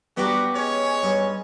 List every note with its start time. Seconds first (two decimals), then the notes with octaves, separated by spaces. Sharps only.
0.17 G3 B3 D4 F#4 G4 A#5
0.55 G#3 C#4 C#5
1.03 G2 C#4